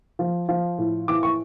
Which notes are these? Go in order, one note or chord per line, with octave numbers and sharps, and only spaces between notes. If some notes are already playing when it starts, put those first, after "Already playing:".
F3
F3
A2
E3 D6
C#6